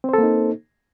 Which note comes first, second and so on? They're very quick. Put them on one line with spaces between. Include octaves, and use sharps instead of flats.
C4 C5 A4 A#3 D#4